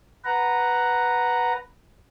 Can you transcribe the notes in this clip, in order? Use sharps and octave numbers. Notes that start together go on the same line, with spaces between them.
B4 F#5 A#5